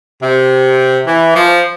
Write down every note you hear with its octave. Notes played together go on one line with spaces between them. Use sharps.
C3
E3
F3